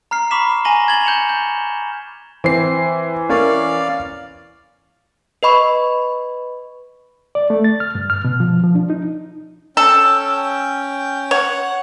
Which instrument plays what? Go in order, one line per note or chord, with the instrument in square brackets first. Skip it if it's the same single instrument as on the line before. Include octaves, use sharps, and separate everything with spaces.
[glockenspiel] A#5 F6 C7
A#5 B5 C#6 D6 B6 E7
G#5 A#5 A#6 D#7 F#7 G7
G#6 A6 F#7 G7
G6 C#7 E7 F7
G6
[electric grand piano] E3 C7 [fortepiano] C4
[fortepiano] C#4 A#4 [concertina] D5 F5
[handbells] B4 D#5 B5 C#6
[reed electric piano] D5
A3
A6
F6
G2
F6
B2
F3
F3
D4
D#4
[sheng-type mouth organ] C#4 G5 [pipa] A4
[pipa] C#5 [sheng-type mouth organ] F#5